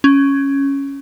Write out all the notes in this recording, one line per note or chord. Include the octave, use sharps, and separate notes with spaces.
C#4